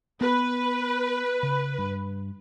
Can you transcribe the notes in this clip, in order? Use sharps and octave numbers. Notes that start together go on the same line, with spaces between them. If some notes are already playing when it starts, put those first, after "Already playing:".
B3 B4
C#3
G2